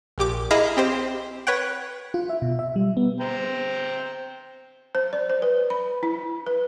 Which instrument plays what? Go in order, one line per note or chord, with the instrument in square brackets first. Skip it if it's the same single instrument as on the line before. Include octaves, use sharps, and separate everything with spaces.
[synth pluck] A#1 A#2 G4 D6
E4 G#4 D#5 F5 A#5 B5
C4 G4 C5
B4 C#5 F#5 G5
[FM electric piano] F4
E5
B2
E5
G3
B3
[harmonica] C5 G5 A#5
[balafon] C5
D5
C5
B4
B5
E4
B4